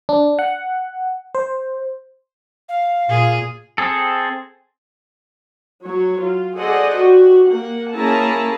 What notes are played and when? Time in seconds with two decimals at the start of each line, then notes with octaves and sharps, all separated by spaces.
0.09 D4
0.39 F#5
1.35 C5
2.69 F5
3.09 A#2 F4 G#4
3.78 C4 G#4 A4
5.85 F#3 C#5
6.22 F4
6.57 G#4 A4 C5 D5 D#5 F#5
6.97 F#4 G4
7.47 A#3 F#5
7.95 A#3 C#4 E4 G#4 A5 A#5